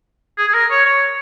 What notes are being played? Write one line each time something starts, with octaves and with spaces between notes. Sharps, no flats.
G#4
G#4
A#4
C#5
C#5